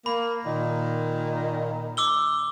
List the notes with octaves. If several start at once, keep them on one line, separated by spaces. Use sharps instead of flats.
A#3 B5
A#2 D#3
D6 E6 G7